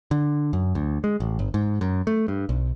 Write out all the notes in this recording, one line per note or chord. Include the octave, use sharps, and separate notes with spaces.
D3
F#2
D2
G#3
A1
G1
G#2
F#2
A3
G2
B1